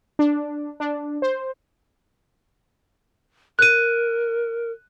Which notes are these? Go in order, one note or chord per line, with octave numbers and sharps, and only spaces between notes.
D4
D4
C5
A#4 F#6 D#7